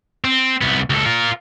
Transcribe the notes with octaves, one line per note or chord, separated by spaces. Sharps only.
C4
C2 B3
C#2 A4
F4 A#4